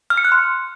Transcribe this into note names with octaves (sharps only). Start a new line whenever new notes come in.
F6
C#7
F#6
C6